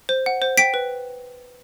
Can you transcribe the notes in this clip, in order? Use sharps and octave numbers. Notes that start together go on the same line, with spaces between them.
C5
F#5
C5
G5 B6 D7
B4